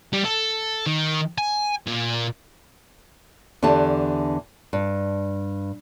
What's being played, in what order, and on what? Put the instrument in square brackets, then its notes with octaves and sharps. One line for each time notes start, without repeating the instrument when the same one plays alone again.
[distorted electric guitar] G3
A4
D#3
G#5
A#2
[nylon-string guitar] E2 D3 E3 G4 A5
G2